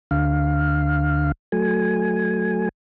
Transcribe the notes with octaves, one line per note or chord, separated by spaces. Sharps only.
D2 D3 F5
F#3 A3 G#5